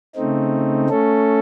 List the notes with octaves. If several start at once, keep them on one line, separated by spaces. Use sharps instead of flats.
C#3 A3 C4 D#4
A3 C#4 A4